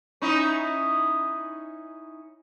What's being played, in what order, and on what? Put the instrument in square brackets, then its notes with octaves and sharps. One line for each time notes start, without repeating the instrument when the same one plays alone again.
[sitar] C#4 D#4 E4